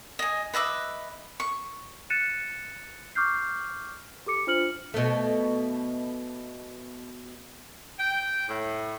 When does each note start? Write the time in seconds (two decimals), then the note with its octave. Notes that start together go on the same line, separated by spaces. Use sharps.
0.19 D#5 G#5
0.54 B4 D#5 E5 D6
1.40 C#6
2.10 F#6 A6 C#7 D#7 E7
3.15 C#6 D6 F6 G6 C7
4.26 G4 A4 D6 C#7
4.47 D4 F4 C5 F6 C#7 F#7
4.94 B2 A3
7.97 G5
8.48 A2